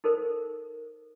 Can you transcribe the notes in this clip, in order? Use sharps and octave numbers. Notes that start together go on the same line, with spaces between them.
D#4 A4 A#4 C5